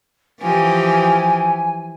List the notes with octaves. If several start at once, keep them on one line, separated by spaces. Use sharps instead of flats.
E3 F3 G4 G#5